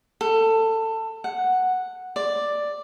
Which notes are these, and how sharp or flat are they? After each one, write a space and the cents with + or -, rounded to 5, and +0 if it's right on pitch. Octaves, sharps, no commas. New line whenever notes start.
A4 +20
F#5 -5
D5 +5